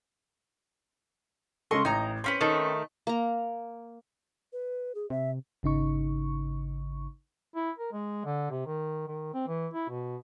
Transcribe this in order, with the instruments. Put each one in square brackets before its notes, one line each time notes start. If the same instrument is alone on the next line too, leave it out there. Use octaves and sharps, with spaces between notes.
[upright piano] C#3 G#3 A4 [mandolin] D#5 C6 C#6
[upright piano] A1 [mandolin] D#4 A#5
[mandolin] C4 C#4 B4 [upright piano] C6
[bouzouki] D#3 A3
[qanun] A#3 A#5
[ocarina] B4
G#4
[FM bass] C3 [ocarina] E5
[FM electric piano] G#1 C#3 D#4 C#6
[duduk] E4
A#4
G#3
D3
C3
D#3
D#3
C4
E3
E4
B2